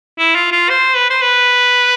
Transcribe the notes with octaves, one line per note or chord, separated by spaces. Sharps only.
E4
F4
F4
C5
B4
C5
B4